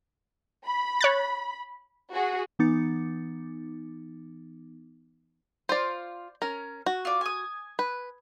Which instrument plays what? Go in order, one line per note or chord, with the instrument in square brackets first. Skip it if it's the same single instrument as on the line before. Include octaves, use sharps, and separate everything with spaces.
[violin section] B5
[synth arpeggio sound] C#5 F#6 A6
[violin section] F#4 G#4
[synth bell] E3 B3 D#4 D6 A6 C#7
[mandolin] F4 [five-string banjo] C5 D5
[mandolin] C#4 [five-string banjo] A#4
[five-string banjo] F#4
[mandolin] F4 D5
G#5 D#6
[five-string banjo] B4